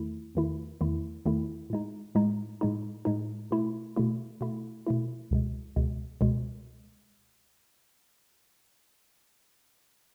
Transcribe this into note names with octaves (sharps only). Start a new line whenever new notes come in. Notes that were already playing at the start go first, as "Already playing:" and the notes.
Already playing: E2 D#3 A3 E4
E2 D#3 A3 E4
E2 D#3 A3 E4
E2 D#3 A3 E4
A2 G#3 D#4
A2 G#3 D#4
A2 G#3 D#4
A2 G#3 D#4
B2 A3 E4
B2 A3 E4
B2 A3 E4
B2 A3 E4
C#2 B2 G#3
C#2 B2 G#3
C#2 B2 G#3